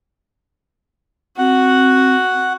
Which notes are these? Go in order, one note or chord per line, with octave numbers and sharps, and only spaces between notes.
C4 F#4 F#5